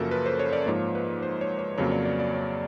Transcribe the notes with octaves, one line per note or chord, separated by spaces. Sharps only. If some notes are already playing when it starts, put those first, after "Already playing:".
Already playing: F#2 C#3 F3 A#3 F#4 A4 A#4
B4
C5
C#5
D5
G#2 F3 A#3 C#5
B4
C5
C#5
C#5
F2 C#3 F#3 A#3 C#5
D5
D5
D5
C#5